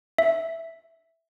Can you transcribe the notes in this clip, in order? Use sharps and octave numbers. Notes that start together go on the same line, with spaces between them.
E5